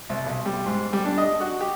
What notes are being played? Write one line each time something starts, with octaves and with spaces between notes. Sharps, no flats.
C2
B1
G3
G#2
G3
D4
D#5
F#4
G4